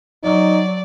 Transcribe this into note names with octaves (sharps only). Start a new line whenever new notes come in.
F#3 D#4 D5